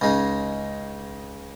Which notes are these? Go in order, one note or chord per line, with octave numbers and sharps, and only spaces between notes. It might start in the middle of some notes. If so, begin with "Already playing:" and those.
C#2 C#3 G#3 D#4